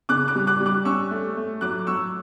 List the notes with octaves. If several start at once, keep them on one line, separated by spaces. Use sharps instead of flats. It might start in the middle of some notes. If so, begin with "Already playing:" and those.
C#3 D6 F#6
D6 F#6
G3
D6 F#6
G3
D6 F#6
C#4 C#6 E6
A3
A3
F#3 D6 F#6
F#3 C#6 E6